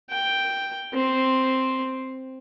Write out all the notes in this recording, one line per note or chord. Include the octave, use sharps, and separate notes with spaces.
G5
C4